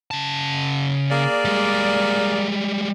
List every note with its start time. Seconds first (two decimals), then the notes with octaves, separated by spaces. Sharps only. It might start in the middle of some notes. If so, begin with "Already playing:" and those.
0.11 C#3 A5
1.11 A#3 G#4 D5
1.45 G3 G#3